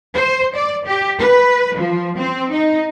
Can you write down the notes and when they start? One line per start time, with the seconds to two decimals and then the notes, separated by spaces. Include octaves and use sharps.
0.15 C5
0.55 D5
0.87 G4
1.18 B4
1.76 F3
2.18 C4
2.53 D#4